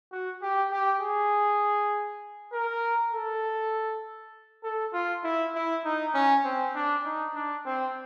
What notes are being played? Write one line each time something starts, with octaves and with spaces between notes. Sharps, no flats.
F#4
G4
G4
G#4
A#4
A4
A4
F4
E4
E4
D#4
C#4
C4
D4
D#4
D4
C4